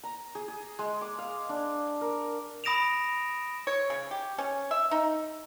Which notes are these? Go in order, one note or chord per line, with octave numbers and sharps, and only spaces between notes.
A#5
G#4
G#4
G#3
D6
F5
D4
A#4
B5 D#6 A#6 D7 E7 F7
C#5
C#3
G4
C#4
E5
D#4